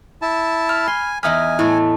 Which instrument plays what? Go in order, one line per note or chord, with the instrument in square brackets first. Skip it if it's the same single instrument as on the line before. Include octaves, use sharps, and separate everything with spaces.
[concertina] E4 A5
[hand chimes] B5 F6
[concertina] G#5 [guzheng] C6
[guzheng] E2 D#4 B5 [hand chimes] E5 D#6 F6 [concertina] G#5
[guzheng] A2 A3 [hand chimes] E4